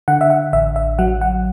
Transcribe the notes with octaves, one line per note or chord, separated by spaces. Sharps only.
D3 F#5
E5
F#5
A1 E5
E5
F#3 F#5
F#5